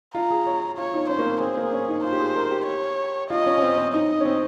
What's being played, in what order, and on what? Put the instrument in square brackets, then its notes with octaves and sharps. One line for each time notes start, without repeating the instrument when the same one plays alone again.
[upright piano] F4 [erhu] A#5
[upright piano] G#4
C#5
[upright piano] F4 [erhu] C#5
[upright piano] D#4
[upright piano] C#4 [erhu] C5
[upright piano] A#3
C4
[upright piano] C4 [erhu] G#4
[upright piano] A#3
C#4
D#4
[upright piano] F4 [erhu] C5
[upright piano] G4
G#4
A#4
G4
[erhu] C#5
[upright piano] F4 [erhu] D#5
[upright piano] C#4
C#4
C4
C4
[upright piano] D#4 [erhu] D#5
[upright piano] C#4
C4